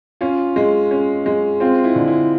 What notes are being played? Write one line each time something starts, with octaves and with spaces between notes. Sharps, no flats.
C#4 F4
G#3
C#4
G#3
C4 F4
E4
D3
E4